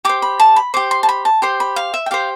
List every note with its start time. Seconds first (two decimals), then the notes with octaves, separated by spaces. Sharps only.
0.05 G4 C5 D6
0.22 B5
0.40 A5
0.56 B5
0.74 G4 C5 D6
0.91 C6
1.03 A5
1.09 B5
1.25 A5
1.42 G4 C5 C6
1.60 B5
1.76 F5
1.94 E5
2.06 G5
2.11 G4 C5 F5